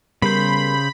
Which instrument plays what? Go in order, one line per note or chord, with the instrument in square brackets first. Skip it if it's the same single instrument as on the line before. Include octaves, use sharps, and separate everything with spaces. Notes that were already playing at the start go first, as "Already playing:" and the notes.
[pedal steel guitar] C#3 C5 [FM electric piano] G3 B3 A#4 [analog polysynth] B5